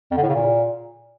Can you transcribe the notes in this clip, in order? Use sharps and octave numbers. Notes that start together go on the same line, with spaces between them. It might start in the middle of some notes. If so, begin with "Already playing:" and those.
F2
D3
A2
C#3
A#2